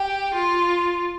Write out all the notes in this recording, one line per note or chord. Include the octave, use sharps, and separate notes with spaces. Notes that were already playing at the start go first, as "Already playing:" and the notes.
Already playing: G4
F4